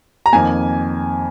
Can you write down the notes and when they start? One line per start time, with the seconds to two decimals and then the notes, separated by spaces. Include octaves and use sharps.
0.26 A#5
0.33 F2 D#3 A#3 G#5